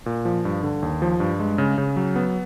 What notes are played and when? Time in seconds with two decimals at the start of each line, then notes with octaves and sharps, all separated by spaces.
0.06 A#2
0.25 F3
0.45 G2
0.63 D3
0.83 D#2
1.02 F3
1.20 G2
1.39 G#3
1.58 C#3
1.78 C#3
1.96 F#3
2.16 B3